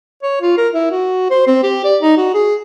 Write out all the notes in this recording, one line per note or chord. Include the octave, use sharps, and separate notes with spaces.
C#5
F4
A#4
E4
F#4
C5
C4
G4
D5
D#4
F#4
G#4